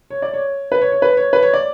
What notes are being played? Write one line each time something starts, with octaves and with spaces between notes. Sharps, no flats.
C#5
D5
C#5
B4
C#5
C#5
B4
C#5
B4
C#5
D5